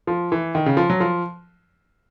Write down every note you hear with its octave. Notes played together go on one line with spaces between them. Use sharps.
F3
E3
D#3
C#3
F3
F#3
F3